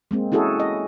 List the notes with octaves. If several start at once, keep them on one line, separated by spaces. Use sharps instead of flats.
G#3 A#3 C4
C#4 E4 F#4 G#4 A4
D#5